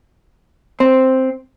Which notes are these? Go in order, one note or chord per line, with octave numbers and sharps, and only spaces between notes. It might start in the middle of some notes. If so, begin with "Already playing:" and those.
C4